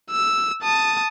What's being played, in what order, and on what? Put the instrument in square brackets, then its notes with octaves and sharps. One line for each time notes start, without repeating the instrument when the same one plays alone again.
[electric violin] E6
A5 D#6